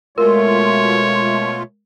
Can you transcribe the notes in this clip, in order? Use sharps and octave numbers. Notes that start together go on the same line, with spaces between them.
B2 G#3 A3 F4 A#4 C#5 E5 C6